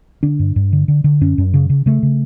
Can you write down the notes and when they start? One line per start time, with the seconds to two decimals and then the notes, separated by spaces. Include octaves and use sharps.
0.23 D3 D4
0.39 G2
0.56 G2
0.73 D3
0.88 D3
1.04 D3
1.21 F#2 C#4
1.38 F#2
1.54 C#3
1.69 C#3
1.86 C#3 A3
2.03 C#3